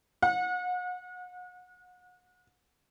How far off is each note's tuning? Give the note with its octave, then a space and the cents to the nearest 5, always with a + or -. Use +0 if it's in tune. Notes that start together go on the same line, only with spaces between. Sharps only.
F#5 -35